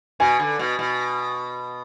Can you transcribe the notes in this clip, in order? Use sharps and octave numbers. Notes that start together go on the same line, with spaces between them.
B2 G#5
D3
B2
B2